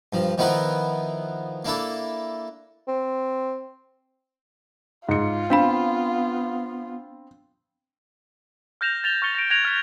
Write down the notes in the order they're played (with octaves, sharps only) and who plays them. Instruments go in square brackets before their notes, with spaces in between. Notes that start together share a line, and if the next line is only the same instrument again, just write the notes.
[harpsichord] G2 F3
D#3 F3 B3 E4 A#4 B4
A#3 D4 E4 A4
[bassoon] C4
[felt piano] G#2 C#7 [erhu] F4
[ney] B3 [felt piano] C4 [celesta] D4 F5 B5
[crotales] F6 G6 A#6 E7 F7
A6 F7 G7
C#6 F6 A6 C#7 G7
A#6 D7
F#6 G#6 A#6 D7 F7
F6 B6